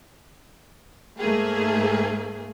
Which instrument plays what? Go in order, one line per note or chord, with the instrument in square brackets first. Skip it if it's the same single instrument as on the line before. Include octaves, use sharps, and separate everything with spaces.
[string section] G#2 A3 A#3 G#4